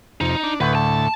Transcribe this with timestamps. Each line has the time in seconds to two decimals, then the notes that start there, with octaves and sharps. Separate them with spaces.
0.21 F2 C3 D#4
0.43 D4
0.61 D2 A2 B4
0.75 A5